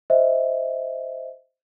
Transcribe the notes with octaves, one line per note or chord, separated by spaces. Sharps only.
C5 D#5 E5